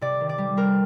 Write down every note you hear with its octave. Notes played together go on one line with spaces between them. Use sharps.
C3 D5
D#3
D5
G3
C4 A#4